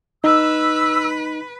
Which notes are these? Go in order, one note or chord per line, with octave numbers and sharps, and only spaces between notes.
D#4 B4 E6